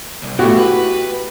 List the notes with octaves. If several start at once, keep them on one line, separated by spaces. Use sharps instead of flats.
C2
B2 A3 E4 F#4 G4 F#5
B4